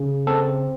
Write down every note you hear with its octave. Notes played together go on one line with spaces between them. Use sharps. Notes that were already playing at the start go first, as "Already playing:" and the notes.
Already playing: C#3
C4 A4